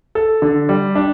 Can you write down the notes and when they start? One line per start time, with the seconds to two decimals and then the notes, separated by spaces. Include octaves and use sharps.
0.15 A4
0.42 D3
0.69 G3
0.95 D4